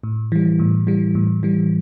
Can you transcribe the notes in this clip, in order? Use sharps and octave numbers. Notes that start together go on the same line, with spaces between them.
A2
E3 G3
A2
E3 G3
A2
E3 G3